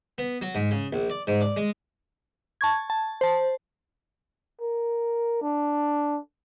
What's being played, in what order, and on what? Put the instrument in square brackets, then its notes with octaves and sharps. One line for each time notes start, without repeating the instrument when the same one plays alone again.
[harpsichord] B3
F#3
G#2
C#3
A#1
D5
G#2
D5
G#3
[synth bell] A5 C#6 G#6
A5
C5 A5
[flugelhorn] A#4
D4